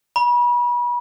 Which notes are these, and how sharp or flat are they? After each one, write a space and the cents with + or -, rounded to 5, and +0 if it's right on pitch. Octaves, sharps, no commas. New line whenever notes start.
B5 -35